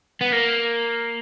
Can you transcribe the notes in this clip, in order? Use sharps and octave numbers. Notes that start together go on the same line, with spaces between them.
B3
A#3